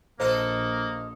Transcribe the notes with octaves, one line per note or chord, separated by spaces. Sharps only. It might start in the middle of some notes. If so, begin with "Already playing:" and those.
A#1 A#3 F4 A4 C5 D#5